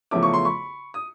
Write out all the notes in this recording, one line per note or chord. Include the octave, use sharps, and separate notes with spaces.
E2 C#3 F3 A3 C#4 D6
C#6
C6
B5 C#6
D#6